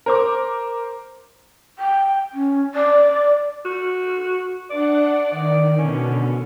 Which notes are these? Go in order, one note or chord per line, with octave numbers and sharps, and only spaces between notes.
A#4 C5 D6
G5
C#4
D5
F#4
D4 D5 F#5
D#3 D5
B2 D3 C#4